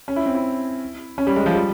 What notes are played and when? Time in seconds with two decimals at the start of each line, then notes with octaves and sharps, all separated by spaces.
0.08 C#4
0.16 E4
0.26 C4
0.35 E4
1.18 C#4
1.27 G3
1.36 G#3
1.46 F3
1.55 G3